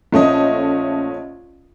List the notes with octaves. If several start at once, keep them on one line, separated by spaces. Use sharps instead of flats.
A#1 A3 C#4 D#5